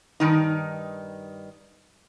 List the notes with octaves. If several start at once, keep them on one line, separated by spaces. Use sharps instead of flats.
G2 D#3 D#4